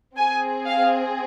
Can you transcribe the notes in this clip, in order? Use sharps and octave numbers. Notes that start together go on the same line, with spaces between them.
C4 G#4 G#5
F5